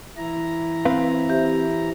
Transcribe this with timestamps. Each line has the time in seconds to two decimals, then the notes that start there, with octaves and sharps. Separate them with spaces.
0.17 E3 E4 A#5
0.85 C4 B4 F5
1.29 G4 C5 E5